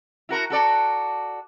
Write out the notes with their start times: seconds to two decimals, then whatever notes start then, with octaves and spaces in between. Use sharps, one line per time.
0.29 E4 F#4 A#4
0.50 F#4 A4 D5